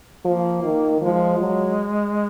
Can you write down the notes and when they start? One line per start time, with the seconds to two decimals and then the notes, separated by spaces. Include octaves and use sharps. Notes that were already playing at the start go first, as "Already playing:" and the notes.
0.24 F3 A#3
0.63 D#3
1.01 F3 G#3
1.39 F#3